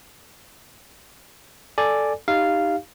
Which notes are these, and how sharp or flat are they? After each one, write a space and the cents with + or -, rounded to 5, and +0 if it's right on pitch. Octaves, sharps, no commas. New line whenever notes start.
A4 +0 D5 +0 G#5 +0
D#4 +0 G4 +0 F5 -10